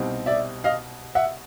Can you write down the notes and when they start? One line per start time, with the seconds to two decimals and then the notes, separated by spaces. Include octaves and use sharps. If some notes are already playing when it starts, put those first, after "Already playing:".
Already playing: C2 B2 G3 C4 D#4
0.26 D5 E5
0.64 D#5 F5
1.15 E5 F#5